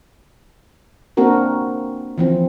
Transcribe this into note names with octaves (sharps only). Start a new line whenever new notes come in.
A#3 C4 D4 F#4 A#4
E3 F3 C4